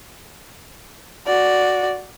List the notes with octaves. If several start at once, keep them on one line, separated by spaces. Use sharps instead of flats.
F#4 D5